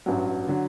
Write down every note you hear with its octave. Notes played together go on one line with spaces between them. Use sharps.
A1 G2 F#3
D3 F#3